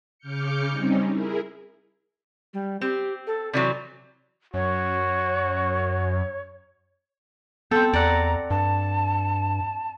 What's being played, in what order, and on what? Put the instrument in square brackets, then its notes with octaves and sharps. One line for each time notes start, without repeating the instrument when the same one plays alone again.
[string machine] C#3 D6 F6 G6 C#7
G3 C4 C#4 D#4
E4 G#4 A#4
[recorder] G3
[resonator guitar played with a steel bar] C4 [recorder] G4
[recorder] A4
[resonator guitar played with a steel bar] C3 E3 F#3 [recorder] D5
[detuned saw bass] F#2 [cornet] F#4 [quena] C#5
[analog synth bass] B3 [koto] C4 A4 [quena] G6
[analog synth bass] E2 [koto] D5 F#5 [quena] A#5
[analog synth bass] G2 [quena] A5